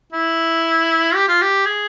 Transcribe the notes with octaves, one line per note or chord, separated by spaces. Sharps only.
E4
G4
F4
G4
G#4